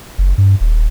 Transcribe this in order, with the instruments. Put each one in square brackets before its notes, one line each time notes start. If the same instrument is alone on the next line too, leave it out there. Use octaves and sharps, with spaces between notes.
[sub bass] F#1
G2
D#1